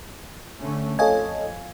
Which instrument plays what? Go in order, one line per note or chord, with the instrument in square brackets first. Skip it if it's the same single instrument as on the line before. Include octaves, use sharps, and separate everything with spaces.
[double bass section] D3 A3 C#4
[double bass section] F2 [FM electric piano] A4 C#5 D#5 [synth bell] F5 G#5 G#6